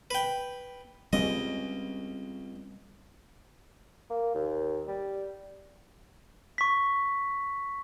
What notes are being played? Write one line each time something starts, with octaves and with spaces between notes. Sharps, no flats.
B4 G5
C#2 G3 C4 C#4 D#5
A#3
D#2
G3
C#6 B6